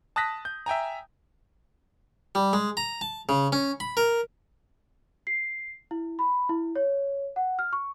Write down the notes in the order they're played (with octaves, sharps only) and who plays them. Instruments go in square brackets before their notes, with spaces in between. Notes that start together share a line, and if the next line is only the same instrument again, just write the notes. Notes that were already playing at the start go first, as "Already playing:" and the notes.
[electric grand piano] A5 D#6 F#6 A#6 B6
G6
E5 G5 G#5 A#5
[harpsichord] G3
G#3
A#5
A5
C#3
C#4
B5
A#4
[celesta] C7
E4
B5
E4
C#5
F#5
F6
C#6